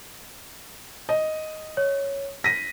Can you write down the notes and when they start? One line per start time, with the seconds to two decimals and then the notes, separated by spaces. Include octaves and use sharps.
1.09 D#5
1.77 C#5
2.44 A#6 B6 D#7